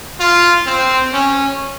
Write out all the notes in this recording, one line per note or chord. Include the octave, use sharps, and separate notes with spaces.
F4
C4
C#4